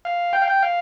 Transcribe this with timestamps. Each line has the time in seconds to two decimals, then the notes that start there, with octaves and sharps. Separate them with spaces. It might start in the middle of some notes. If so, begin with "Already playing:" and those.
0.05 F5
0.33 G5
0.42 F5
0.48 G5
0.63 F5